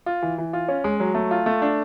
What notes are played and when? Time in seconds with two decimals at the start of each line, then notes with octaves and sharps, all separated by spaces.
0.06 F4
0.22 E3
0.38 E3
0.53 F4
0.69 C#4
0.84 G#3
1.00 F#3
1.15 A3
1.31 F4
1.46 A3
1.62 D4